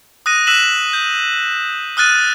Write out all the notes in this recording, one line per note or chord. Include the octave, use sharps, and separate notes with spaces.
D#6 F#6 A#6 D#7
E6 F#6 B6 E7 F#7
G6
D#6 F6 F#6 A6 D#7